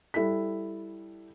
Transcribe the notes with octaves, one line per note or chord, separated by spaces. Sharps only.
G3 E4 A4 B6